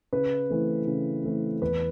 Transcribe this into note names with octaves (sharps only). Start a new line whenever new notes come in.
C#3 B4
E3 A3 C4
C#3
E3 A3 C4
E2 B4